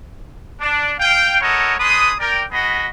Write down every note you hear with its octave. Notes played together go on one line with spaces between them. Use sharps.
D4
F5 G5
E4 A4 A#4 C#5 D#5 F#5
D4 G#4 B4 C6 D#6
A#4 D5 G5
B3 F#4 G#4 D#5 B5